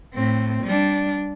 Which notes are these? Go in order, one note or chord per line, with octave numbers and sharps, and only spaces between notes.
A2 C4
G3 D4